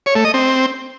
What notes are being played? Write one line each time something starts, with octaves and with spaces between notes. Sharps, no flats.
C#5
A3
D#5
C4